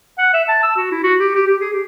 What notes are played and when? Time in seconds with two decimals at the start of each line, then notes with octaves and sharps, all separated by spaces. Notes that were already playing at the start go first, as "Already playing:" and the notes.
0.18 F#5
0.33 E5
0.48 A5
0.63 E6
0.77 F#4
0.92 E4
1.03 F#4
1.20 G4
1.35 G4
1.47 G4
1.60 G#4
1.73 G4